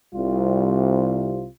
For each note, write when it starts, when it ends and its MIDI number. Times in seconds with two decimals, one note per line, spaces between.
0.14 1.46 36
0.14 1.46 48
0.14 1.46 55
0.14 1.46 65